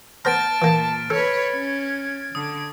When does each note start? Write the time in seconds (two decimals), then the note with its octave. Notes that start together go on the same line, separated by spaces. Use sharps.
0.25 B3 C5 A5 A#5 F6 A6 D7
0.62 A#2 E3 A#3
1.10 A4 B4 C#5 G#6
1.55 C#4
2.35 D3 D#6